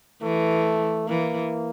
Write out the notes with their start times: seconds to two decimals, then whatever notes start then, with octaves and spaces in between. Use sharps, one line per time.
0.23 E3 A3
1.08 E3 A#3